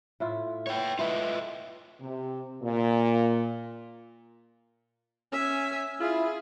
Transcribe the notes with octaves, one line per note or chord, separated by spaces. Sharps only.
A2 E4 F4
B3 C#5 G5
A3 E4 F4 B4 D#5
C3
A#2
C#4 E5 G#5
E4 F4 G#4